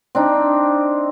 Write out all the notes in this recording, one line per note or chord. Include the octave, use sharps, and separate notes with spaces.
C4 D4 D#4